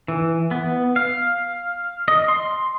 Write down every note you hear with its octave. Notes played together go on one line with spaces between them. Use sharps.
E3
B3
F5
D#5
C6